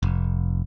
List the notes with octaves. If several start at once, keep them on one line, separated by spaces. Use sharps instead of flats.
F1